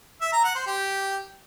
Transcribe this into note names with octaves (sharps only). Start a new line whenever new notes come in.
E5
A#5
F#5
C5
G4